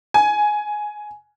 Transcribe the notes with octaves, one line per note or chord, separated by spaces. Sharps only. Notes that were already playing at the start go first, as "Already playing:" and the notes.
G#5